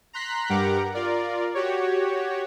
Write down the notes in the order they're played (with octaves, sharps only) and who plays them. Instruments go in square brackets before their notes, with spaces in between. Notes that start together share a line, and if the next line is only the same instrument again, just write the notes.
[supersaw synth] A#5 C6 F#6 B6
G2 G4 A#4 F#5 A#5 D6
F4 A#4 D5
F#4 G4 C#5